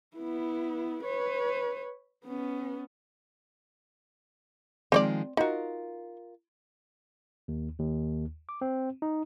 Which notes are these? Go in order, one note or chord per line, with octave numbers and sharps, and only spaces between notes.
B3 E4
B4 C#5
B3 C#4
D#3 F3 G#3 C4 C#5 D5
D#4 F4 F#4 A#4
D#2
D#2
D6
C4
D#4